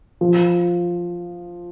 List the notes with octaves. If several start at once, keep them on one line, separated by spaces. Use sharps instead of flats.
F3